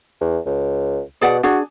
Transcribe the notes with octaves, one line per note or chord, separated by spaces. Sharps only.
E2
C#2
B2 G#4 D5 F#5
D4 F#4 G#4